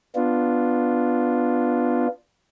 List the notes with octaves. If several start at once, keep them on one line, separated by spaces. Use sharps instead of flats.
B3 D4 F4